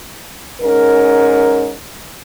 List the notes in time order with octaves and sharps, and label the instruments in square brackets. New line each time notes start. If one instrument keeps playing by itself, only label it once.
[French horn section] G#2 C#4 A#4